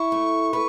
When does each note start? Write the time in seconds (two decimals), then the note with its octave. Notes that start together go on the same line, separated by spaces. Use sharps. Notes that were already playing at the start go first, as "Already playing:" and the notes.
Already playing: E4 C#6
0.12 A3
0.53 B4